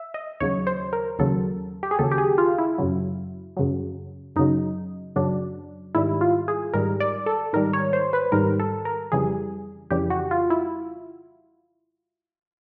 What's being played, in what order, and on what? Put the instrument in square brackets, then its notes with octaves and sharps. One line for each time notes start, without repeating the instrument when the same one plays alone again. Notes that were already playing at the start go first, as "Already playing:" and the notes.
Already playing: [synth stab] E5
D#5
D#2 C#3 F#3 C#5
C5
A#4
D#2 C#3 F#3 A4
G4
G#4
D#2 C#3 F#3 A4
G4
G#4
F4
E4
F#2 C#3 F#3
F#2 C#3 F#3
F#2 C#3 F#3 D#4
F#2 C#3 F#3 D4
G#2 D#3 G3 E4
F4
G#4
G#2 D#3 G3 A#4
D5
A4
G#2 D#3 G3 A#4
C#5
C5
B4
G#2 D#3 G3 A#4
A4
A#4
F2 C#3 E3 G3 G#4
F2 C#3 E3 G3 G4
F#4
F4
E4